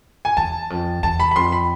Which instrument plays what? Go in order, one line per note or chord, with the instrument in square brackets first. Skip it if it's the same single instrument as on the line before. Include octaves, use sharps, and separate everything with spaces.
[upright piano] G#5
[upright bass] E2 [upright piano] A5
[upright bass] F2
[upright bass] E2 [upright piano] A5
[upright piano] B5
B5
[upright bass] F2 [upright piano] C6
[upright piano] B5